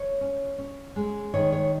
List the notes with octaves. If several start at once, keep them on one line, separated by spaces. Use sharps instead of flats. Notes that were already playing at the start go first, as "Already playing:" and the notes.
Already playing: C#5
C#4
C#4
G#3
D#3 C#5
C#5